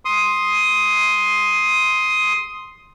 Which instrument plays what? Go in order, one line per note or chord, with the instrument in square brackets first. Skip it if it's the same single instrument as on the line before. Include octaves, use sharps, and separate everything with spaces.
[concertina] C6 D#6